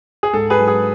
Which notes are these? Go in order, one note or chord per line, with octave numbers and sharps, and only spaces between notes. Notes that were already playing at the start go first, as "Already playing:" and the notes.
G#4
G#2 A4
G#4 B4
F#3
G#4